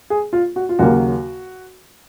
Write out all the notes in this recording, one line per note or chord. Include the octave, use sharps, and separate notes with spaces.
G#4
F4
F#4
F4
D#2 C#3 F#3 A#3 F#4